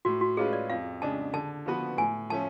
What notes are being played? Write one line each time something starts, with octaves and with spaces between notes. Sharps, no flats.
A2 F#4
F#4
G#3 C#4 F4 G#4 B4
D5
F2 F5
C#3 G#3 D4 A5
D3 A5
F3 B3 F#4 B4
A2 G#5
F3 A3 C#4 A5